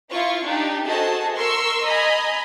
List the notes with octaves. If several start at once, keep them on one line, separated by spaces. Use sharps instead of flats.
E4 F4 C#6
D4 D#4 G4
F#4 G#4 A4 C5 D#5 A5
A#4 C6 C#6 E6
D#5 G#5 A#5 B5